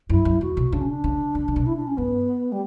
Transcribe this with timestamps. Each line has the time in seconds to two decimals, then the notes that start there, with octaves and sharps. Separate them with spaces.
0.10 F#2 E4
0.25 F#2
0.41 E2 F#4
0.57 B2
0.72 C#3 D4
0.81 C#4
0.89 D4
1.04 C#3
1.35 C#3
1.48 C#3
1.56 B2
1.66 E4
1.76 D4
1.87 C#4
1.97 G2 B3
2.52 G3